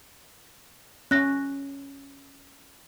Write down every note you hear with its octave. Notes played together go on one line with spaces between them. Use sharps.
C#4 F#6 A#6